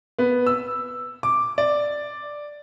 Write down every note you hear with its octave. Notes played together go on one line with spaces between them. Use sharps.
B3
E6
D6
D5